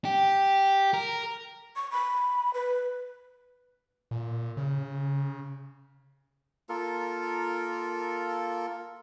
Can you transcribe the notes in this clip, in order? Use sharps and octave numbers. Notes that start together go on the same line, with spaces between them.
G4
A#4
C#6
B5
B4
A#2
C#3
A#3 F4 A4 A#4